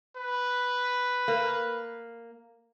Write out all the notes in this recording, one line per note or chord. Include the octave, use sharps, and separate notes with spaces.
B4
A#3